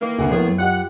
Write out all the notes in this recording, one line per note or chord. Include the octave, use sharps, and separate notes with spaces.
D#3 E3 A#3
D2 C3 F#4 G#4
A2 F3 A#3 B3 G#4
F#2
F4 G4 D#5 F#5